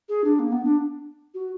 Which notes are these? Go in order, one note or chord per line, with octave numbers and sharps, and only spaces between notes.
G#4
D4
A#3
B3
D4
F#4